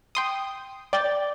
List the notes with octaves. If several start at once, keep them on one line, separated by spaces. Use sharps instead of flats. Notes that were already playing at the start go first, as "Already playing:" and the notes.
G5 C6 D#6
D5 G5 G6 A6